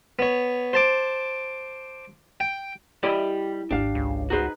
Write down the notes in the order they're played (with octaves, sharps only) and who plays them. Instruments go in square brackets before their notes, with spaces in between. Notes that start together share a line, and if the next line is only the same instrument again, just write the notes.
[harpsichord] B3 C#5
C5 A5 D6
G5
[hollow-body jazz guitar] G3 D5 D#5 [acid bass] E4 [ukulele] G4 B5
[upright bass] G#1 D#2 [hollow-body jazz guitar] D4 [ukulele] G4 F5
[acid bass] C#2
[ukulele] D#4 G#4 B4 [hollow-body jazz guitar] F#4 C5